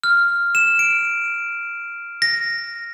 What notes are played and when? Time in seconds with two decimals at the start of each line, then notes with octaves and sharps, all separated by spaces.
0.04 F6
0.55 E7
0.79 D7
2.22 A#6